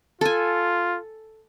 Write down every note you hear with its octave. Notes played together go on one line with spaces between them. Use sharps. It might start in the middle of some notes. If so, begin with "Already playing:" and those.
F4 A4 G#5